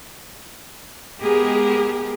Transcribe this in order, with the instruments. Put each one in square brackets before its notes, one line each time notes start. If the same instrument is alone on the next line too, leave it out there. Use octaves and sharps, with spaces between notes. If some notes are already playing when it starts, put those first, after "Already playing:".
[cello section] G#3 B3 G4 G#4 A#4